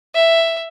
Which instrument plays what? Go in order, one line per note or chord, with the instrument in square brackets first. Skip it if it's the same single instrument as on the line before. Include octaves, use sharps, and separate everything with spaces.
[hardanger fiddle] E5